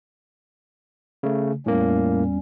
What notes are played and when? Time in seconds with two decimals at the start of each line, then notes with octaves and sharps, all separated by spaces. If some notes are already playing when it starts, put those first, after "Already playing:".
1.23 C#3 A3
1.66 E2 A2 G3 A#3 C#4